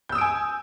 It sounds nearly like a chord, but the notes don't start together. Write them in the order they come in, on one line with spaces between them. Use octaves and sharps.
G6 E6 D#6 D7 G#5